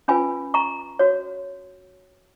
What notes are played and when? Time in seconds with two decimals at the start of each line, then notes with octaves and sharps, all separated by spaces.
0.08 C#4 F4 B4 G#5 B5
0.54 A#5 C#6
0.99 F#4 C#5